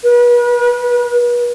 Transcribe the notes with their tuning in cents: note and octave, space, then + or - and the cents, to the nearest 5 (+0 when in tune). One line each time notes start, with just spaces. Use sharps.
B4 -35